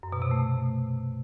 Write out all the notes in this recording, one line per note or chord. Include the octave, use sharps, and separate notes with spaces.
F#2
B2
C3
A3